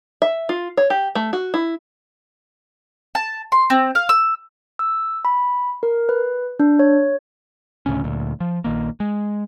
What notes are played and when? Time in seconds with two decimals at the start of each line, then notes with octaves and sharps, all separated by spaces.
0.22 E5
0.49 F4
0.77 C#5
0.90 G4
1.15 A3
1.33 F#4
1.54 E4
3.15 A5
3.52 C6
3.70 C4
3.95 F5
4.09 E6
4.79 E6
5.25 B5
5.83 A#4
6.09 B4
6.60 D4
6.79 C#5
7.86 D2 A2 C#3 C#4
8.04 D2 A#2
8.40 F3
8.64 A#1 D#3 A#3
9.00 G#3